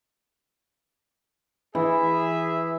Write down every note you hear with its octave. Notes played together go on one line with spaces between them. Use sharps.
E3 G#4 E5